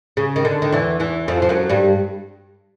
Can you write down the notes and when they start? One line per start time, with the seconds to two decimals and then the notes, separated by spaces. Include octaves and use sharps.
0.17 C#3
0.36 D#3
0.45 D3
0.62 D#3
0.72 E2 E3
1.00 E2 E3
1.28 F2 F3
1.42 F3
1.49 F#2 F#3
1.69 G2 G3